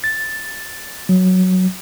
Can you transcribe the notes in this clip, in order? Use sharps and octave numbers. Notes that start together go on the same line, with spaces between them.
A6
F#3